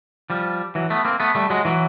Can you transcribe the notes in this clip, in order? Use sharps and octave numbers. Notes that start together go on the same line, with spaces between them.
F3 G3
E3 F#3
A3 B3
A#3 C4
A3 B3
G3 A3
F#3 G#3
E3 F#3